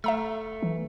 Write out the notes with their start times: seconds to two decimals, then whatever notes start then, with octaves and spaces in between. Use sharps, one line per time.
0.04 A3 E5 A#5 E6
0.62 E3